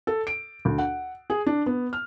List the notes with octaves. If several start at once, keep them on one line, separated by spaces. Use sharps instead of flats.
A4
D7
D2
F#5
G#4
D4
B3
F6